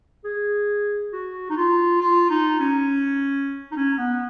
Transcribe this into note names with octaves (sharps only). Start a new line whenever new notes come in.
G#4
F#4
D#4
F4
F4
D#4
C#4
D#4
C#4
B3